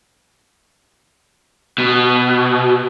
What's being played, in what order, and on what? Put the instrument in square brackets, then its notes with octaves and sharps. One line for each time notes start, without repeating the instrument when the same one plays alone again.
[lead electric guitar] B2